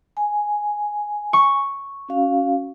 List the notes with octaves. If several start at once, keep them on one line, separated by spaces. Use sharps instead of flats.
G#5
C#6
C#4 F#4 F5